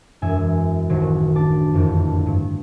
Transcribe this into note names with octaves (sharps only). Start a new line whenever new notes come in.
E1 F#2 E5 G#5
D#1 A1 D#3 F#3 C5 G#6
D4 A5 D6
F#1 F2 D3
G2